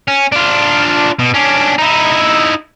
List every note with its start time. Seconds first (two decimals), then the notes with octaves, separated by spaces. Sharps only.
0.08 C#4
0.32 D4 F4
1.19 B2
1.34 C#4 D4
1.78 D#4 E4